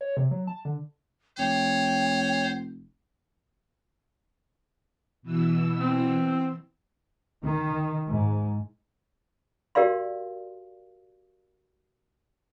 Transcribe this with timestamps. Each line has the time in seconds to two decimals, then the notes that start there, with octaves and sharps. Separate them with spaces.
0.01 C#5
0.17 C3
0.31 F#3
0.47 A5
0.65 D3
1.38 F1 C5 C#5 G5
5.22 B2 E3 E6
5.80 C4
7.43 D#3
8.09 G#2
9.75 F#4 G4 A#4 D5 F5 C6